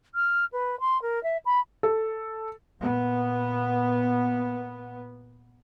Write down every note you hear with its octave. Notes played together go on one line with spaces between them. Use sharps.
F6
B4
C6
A#4
E5
B5
A4
A#2 B3